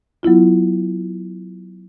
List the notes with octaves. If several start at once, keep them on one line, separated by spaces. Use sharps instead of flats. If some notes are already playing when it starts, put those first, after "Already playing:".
F#3 B3 E4 F4